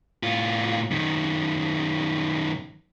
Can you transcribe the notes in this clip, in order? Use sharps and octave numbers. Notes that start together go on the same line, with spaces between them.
A2 F4
F#2 D#3